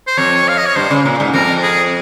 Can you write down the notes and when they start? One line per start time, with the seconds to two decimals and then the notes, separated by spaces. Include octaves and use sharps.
0.07 C5
0.17 F2 C#5
0.48 F5
0.57 D#5
0.66 C#5
0.76 G2 C5
0.90 C#3
1.05 A#2
1.20 G#2
1.33 F2 A#4
1.63 G#4